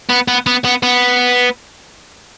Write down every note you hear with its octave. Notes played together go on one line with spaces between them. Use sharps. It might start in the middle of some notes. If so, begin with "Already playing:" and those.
B3
B3
B3
B3
B3